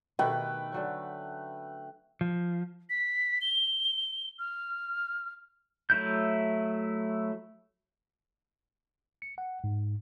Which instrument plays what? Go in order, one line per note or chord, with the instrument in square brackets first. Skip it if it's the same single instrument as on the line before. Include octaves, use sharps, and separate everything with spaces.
[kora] B2 D#3 G4 [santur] A3 B4 [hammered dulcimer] G5
[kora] D3 F#3 C#4
[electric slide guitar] F3
[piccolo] B6
G7
F6
[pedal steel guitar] F#3 A3 E4 G6
[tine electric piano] C#7
F#5
G#2